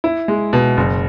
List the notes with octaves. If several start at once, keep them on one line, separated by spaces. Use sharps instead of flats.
E4
G#3
B2
F#1